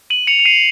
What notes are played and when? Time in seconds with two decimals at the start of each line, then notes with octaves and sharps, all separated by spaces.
0.10 D#7 F#7
0.27 C#7 F7
0.39 F7
0.45 C7 D#7